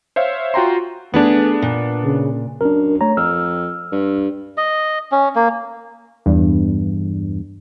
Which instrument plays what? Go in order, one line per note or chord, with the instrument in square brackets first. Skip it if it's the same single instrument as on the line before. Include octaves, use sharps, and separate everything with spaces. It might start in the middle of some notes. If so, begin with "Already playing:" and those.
[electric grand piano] C5 C#5 E5 F5
F4 F#4 G5 A#5 C6
[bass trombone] A3 [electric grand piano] B3 D4 [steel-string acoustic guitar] G#4 B4
[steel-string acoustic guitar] A#2
[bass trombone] C#3
[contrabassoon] F#2 [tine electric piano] D4 A#4
[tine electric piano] A3 C#5 A#5
[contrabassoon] F2 [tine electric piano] E6 F6
[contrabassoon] G2
[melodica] D#5
C#4
A#3
[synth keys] E2 G2